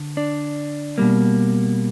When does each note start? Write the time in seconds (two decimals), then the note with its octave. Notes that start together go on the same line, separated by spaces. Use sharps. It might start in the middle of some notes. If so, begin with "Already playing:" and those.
Already playing: D3
0.17 D4 D5
0.98 B2 G3 A#3